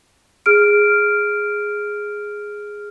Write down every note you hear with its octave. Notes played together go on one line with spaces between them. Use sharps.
G#4 F6 D7